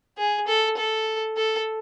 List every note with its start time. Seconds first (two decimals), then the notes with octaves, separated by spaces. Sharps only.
0.18 G#4
0.47 A4
0.77 A4
1.37 A4